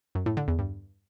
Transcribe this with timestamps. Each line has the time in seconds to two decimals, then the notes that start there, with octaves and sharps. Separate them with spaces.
0.15 F#2
0.26 A2
0.37 D3
0.48 E2
0.59 G2